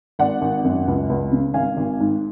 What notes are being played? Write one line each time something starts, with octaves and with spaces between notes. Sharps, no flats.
G#1 D5 F#5
G#1
F#2
C#2
C#2
C#3
G#1 F5 G#5
G#1
G#2